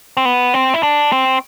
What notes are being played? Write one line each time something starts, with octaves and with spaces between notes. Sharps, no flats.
C4
B3
C4
E4
D4
C4